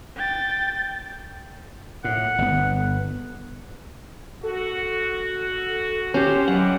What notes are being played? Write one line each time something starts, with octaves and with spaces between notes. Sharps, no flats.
G5 A6
A2 F#5
G1 B3
F#4 A4
C#4 G4 C5
D#3 E3 F#3 D4 F#5